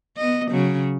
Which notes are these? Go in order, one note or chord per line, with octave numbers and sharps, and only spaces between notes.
B3 D#5
C#3 F#3